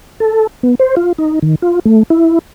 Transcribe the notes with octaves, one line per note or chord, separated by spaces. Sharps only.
A4
B3
C5
F4
D#4
D#3
F4
A3
E4